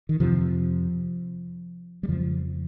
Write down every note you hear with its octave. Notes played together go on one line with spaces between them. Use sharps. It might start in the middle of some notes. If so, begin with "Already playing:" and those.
D#3
F2 C3 F3
G3
F2 C#3 F3